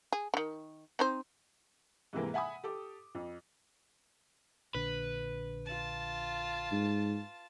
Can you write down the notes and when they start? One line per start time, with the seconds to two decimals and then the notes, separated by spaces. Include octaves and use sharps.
0.12 G#4
0.34 D3 D#3
0.99 C4 D#4 C5
2.13 G#2 C3 E3 A#3
2.34 E5 F#5 G#5 B5 D#6
2.64 G4 A4 D6
3.15 F2
4.75 A#1 D3 B4
5.65 F4 A5
6.71 G#2